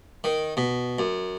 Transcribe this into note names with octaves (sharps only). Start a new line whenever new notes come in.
D#3
B2
F#2